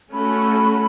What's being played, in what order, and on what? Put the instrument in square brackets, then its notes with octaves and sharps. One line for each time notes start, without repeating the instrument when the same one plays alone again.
[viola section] A3 C#4 F#4 A4 [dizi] B5